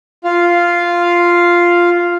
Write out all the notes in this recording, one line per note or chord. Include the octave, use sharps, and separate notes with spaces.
F4 F5